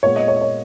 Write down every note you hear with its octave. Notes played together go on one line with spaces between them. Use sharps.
A#2 G#3 B3 C#5
D#5
C#5
D#5
C#5